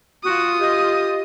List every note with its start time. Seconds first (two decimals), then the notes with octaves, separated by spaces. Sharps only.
0.23 F4 F#4 D#6
0.61 G4 D#5